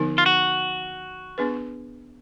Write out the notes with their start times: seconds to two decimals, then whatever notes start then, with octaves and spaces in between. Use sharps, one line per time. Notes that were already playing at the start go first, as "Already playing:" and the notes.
Already playing: D3 F3 B3 D#4 A#4
0.18 F4
0.26 F#4
1.38 B3 D4 G#4 B4